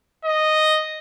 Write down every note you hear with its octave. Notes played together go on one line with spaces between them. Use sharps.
D#5